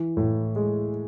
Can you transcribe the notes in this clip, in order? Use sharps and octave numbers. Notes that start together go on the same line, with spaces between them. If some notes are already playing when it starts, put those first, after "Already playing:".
Already playing: E3
A2
G#3